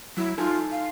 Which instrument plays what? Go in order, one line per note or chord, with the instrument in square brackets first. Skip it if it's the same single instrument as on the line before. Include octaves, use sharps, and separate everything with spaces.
[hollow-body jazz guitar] F#3 [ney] E4
[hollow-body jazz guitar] D#4 A4 G#5 [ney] F4
[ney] F5